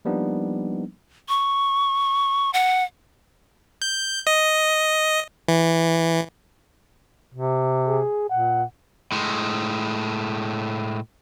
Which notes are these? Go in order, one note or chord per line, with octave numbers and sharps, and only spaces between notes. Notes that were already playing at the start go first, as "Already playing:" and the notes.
F3 G3 A#3 B3 D4 D#4
C#6
F#5
G6
D#5
E3
C3
G#4
A#2 F#5
A2 G#3